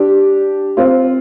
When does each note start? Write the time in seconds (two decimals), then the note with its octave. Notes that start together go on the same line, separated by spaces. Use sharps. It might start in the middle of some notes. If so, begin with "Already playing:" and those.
Already playing: D4 G4
0.77 C4 F4